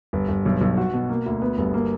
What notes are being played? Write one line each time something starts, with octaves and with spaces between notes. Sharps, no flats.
G1
G1
B1
B1
F#4
B2
A#3
D2
B3
G1
A#3